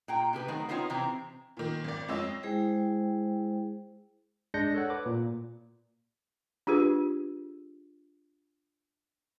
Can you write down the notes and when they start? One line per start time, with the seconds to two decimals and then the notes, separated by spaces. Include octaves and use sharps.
0.08 A#2 G5 A#5
0.33 C3 G4 G#4 B4
0.48 D#3 F#3 A3 C4 F#4
0.69 B3 C4 D#4 F4 C#5
0.90 C3 E3 C4 A#5
1.57 A#2 D#3
1.84 G#1 D5
2.08 F2 G#3 C#5 D#5 E6
2.43 G#3 E4 G#4 C5 G5
4.54 G#3 D4 G6 A#6 C#7
4.74 A4 C#5 F#5
4.90 B4 D6
5.06 A#2
6.67 D4 F4 G4 G#4 B4